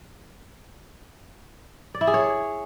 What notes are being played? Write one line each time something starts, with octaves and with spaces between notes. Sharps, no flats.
D5
E4
G#4
C#5